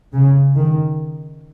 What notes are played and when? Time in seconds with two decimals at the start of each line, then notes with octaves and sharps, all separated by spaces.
0.13 C#3
0.56 D#3